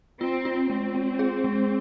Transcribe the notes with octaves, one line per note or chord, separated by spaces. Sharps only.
C4 F4
F4
G#3 C4
G#3
G#4
G#3